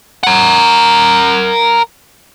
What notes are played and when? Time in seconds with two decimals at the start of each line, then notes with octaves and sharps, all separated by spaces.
0.23 A#4 F#5